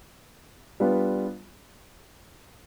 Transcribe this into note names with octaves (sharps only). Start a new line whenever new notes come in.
G3 B3 D4 F4 B4